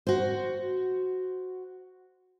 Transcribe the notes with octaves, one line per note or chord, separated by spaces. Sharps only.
F#4 C5